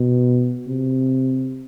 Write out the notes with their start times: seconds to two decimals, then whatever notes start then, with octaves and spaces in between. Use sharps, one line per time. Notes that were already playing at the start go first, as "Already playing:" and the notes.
Already playing: B2
0.67 C3